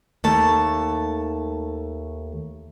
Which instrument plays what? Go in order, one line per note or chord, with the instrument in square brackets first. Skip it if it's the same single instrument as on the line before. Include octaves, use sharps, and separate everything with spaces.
[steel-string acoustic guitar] D#2 A3 A5